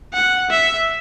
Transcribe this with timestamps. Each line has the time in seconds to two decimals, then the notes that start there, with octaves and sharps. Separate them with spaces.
0.14 F#5
0.51 E5